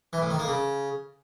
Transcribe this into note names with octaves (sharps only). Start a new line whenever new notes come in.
E3
A2
D#3
A#3
C#3